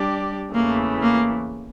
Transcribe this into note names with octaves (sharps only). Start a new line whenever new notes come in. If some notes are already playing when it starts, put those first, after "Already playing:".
Already playing: G3 D4 G4 D5
E2 C#3 E3 A3 A#3
A#3